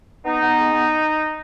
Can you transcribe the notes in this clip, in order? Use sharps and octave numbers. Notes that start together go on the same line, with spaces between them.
B3 D#4
B3
G#3
B3